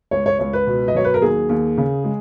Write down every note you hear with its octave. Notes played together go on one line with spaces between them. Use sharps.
C#2 C#5
C#5
C#2 C#5
B4
B2
D#5
F#3 C#5
B4
A#4
D#2 G#4
D#2
C#3
G#3